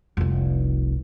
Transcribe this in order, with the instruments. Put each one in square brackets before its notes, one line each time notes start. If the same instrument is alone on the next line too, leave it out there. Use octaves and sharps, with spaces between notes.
[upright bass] F1 C2